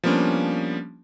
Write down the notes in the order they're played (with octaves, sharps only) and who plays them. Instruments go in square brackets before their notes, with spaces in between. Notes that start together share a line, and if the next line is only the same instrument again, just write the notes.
[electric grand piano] F3 G3 A#3 B3 C#4 D4